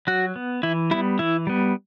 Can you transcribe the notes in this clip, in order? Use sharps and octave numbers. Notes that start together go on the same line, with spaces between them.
F#3 F#4
B3
E3 E4
G3 B3 E4
E3 E4
G3 B3